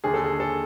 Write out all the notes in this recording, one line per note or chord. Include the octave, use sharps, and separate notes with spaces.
D#2 D3 G#4
A4
G#4
A4